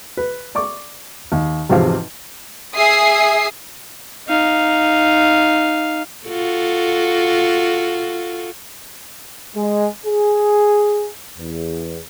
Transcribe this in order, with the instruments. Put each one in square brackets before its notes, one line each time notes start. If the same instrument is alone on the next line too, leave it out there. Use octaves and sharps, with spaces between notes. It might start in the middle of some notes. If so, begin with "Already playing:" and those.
[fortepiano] B4
D5 C#6 D6
D#2
G#1 E2 C3 F3 F5
[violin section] G#4 E5 D#6 C7
[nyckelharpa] D#4 F5
[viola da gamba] F4 F#4 A4
[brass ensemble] G#3
G#4
E2